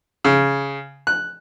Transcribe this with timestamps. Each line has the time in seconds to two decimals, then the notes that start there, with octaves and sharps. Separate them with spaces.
0.24 C#3
1.07 F#6